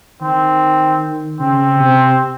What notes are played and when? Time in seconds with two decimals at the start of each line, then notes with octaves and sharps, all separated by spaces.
0.22 D#3 C4
1.40 C#3 C4
1.80 C3